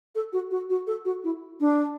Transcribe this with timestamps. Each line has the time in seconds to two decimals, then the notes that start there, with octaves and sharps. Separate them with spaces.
0.15 A4
0.33 F#4
0.51 F#4
0.70 F#4
0.87 A4
1.05 F#4
1.24 E4
1.60 D4